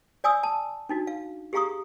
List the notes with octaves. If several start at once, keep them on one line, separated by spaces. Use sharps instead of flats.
D5 G#5 D#6 E6
A5
D4 D#4 F#4
F5
G4 G#4 F5 A#5 C#6 D#6